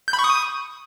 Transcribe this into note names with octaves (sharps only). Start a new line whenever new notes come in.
G6
B5
C#6
D#6